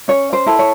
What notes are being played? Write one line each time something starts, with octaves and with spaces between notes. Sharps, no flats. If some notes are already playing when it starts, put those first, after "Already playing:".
C#4 C#5
C5
E4 A4
C#5